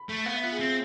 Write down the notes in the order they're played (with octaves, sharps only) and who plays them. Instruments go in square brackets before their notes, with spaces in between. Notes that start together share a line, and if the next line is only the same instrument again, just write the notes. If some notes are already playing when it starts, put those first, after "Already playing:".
Already playing: [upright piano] B5
[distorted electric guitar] A3
[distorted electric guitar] B3 [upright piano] F5
[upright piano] E5
F4
G#4
[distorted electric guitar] C4